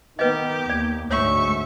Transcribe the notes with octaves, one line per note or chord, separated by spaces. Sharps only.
D#3 B3 G4 B4 D#5
D#2 D5
D2 G#2 C#5 E5 C#6